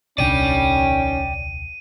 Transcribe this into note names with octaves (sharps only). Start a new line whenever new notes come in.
D#1 C2 D#3 C#4 D4 D5 G5 D#7